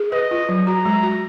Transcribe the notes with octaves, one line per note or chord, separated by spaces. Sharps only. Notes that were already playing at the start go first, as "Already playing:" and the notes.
Already playing: G#4
B4 D#5
F4
F#3
F#4 A#5
G#3
F#4